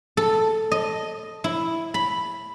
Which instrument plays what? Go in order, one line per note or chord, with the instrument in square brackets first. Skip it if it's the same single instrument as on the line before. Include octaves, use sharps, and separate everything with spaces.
[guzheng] A4
D#5
E4
B5